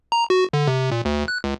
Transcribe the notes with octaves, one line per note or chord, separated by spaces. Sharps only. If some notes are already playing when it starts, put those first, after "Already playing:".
A#5
F#4
D3
C3
A#2
D2
F#6
C#2